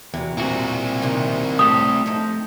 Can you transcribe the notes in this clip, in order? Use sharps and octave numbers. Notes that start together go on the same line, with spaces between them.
E2 C3 F#3
A#2 C4 E4 F#4
D#2 C3 D#3
A2 A3 G4 A4 D#6
F3 D#4